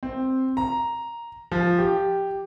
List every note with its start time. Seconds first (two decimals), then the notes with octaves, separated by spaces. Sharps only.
0.03 C4
0.57 A#5
1.52 F3
1.79 G4